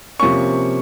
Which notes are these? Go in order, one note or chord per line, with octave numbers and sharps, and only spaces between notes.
C3 F3 A#3 C#4 C#6